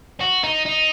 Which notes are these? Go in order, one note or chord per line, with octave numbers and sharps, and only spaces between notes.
F#4
D#4
D#4